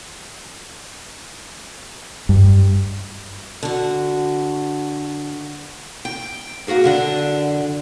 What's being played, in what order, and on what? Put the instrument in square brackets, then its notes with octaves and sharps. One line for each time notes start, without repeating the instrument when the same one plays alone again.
[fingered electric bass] G2
[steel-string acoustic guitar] D3 F#4
G5
C3 A#3 F#4 G#4 A#4
F#2 D3 D4